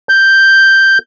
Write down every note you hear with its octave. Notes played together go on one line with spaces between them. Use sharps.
G6